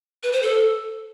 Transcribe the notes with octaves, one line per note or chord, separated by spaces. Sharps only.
B4
C5
A4